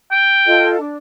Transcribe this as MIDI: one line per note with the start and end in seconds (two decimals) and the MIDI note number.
0.11 0.70 79
0.46 0.78 65
0.46 0.78 69
0.46 0.78 75
0.79 0.97 62